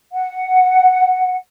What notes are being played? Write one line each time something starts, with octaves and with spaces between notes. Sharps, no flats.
F#5